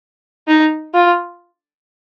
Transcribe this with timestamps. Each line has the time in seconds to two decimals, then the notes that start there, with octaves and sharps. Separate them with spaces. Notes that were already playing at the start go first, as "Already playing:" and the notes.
0.48 D#4
0.94 F4